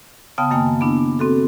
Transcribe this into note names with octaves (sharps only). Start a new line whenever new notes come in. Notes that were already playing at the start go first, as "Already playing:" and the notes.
C#3 B3 F5 G5 A5 D#6
F#2 D#3 A#3 G5 G#5
B3 D4 E4
C4 F#4 A4